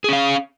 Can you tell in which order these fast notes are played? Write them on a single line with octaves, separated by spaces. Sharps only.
G#4 C#4 F5